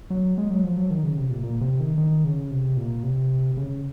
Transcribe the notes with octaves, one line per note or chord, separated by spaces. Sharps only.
F#3
G#3
F#3
F3
F#3
D#3
C#3
C3
A#2
A#2
C3
D#3
D#3
C#3
C3
A#2
C3
C#3